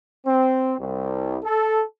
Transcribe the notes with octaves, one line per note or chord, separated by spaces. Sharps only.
C4
C2
A4